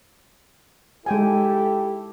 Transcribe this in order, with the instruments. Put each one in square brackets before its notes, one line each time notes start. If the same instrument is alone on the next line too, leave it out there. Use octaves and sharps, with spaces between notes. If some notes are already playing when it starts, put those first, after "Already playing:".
[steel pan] G#3 G5 G#5 [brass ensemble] E4 G4 A4